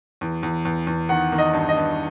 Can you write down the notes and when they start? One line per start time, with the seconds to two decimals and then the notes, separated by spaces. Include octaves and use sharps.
0.21 E2
0.43 E2
0.65 E2
0.87 E2
1.09 D#3 F#5
1.32 D#3
1.38 D#5
1.53 G2
1.69 D#5
1.76 G2